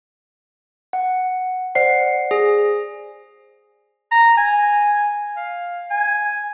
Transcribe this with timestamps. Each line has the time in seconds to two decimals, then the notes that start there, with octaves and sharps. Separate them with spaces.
0.93 F#5
1.75 C5 D5 F#5 C7
2.31 G#4
4.11 A#5
4.37 G#5
5.37 F5
5.91 G#5